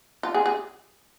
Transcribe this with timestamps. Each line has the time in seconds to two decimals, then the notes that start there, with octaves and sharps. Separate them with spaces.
0.23 F4
0.34 G#4
0.46 G#4